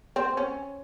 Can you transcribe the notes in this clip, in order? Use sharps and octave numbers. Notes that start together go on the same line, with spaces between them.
C4
C#4